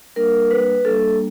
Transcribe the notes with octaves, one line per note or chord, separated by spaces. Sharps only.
G3 A#3 D4 A#4
B4
G3 A#3 D4 A4